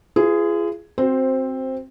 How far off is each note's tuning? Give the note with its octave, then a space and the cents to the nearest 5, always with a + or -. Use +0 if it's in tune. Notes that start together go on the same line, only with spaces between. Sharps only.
F4 -40 G#4 +0 B4 +30
C4 +10 F#4 +0 C5 +0